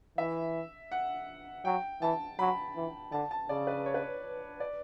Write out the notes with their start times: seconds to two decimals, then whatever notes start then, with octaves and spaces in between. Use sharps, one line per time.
0.18 E3 E5
0.92 F#5
1.65 F#3 G5
2.02 E3 A5
2.39 F#3 B5
2.76 E3
3.12 D3 A5
3.31 A5
3.49 C#3 D5
3.67 B4
3.86 C#5
3.94 B4
4.03 C#5
4.60 D5